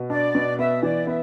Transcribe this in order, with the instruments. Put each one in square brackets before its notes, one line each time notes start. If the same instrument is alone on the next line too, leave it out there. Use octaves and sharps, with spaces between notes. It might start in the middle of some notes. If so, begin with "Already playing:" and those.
Already playing: [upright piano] B2
[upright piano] D4 [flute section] D5
[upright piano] B2
[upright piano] B3 [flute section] E5
[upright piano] E3 [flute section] D5
[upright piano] B3 [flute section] E5